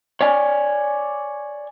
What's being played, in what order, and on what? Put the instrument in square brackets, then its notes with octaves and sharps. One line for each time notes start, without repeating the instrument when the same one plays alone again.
[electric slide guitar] C#5 D5 G#5